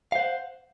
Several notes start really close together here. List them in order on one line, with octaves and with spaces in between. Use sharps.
F5 C5 F#5